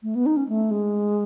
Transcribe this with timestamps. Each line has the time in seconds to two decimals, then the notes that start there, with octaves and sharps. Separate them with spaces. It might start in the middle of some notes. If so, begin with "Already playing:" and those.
0.03 A3
0.15 B3
0.26 D#4
0.37 C#4
0.49 A3
0.71 G#3